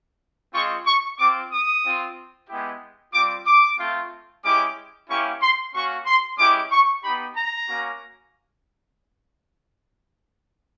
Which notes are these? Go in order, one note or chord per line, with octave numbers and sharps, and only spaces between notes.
G#3 C4 F4 C#6
C#6
C4 F4 D6
D#6
C4 F4
G#3 B3 E4 G4
G3 C4 F4 D6
D6
A3 C4 F4
G#3 C#4 E4 G4 D6
A#3 C#4 E4 G4 C#6
C6
A#3 C#4 F#4 C#6
C6
G#3 C#4 E4 G4 D6
C#6
B3 D#4 G4 B5
A#5
A#3 C#4 F#4